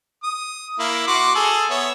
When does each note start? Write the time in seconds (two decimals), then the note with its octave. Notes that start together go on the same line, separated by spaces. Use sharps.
0.23 D#6
0.79 A#3 E4
1.07 F#4 C6 D6
1.35 G#4 A4
1.70 B3 C#5 E5